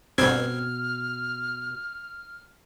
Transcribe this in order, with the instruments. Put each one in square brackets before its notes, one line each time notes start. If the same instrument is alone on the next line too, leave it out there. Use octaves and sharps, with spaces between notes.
[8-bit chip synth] G1 C4 G#6 [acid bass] B2 [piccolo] F6